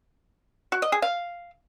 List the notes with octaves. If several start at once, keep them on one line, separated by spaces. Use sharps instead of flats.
F#4
D#5
G#4
F5